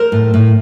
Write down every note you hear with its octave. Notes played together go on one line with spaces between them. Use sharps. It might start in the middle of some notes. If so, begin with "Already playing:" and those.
Already playing: A#4 C5
A2
A2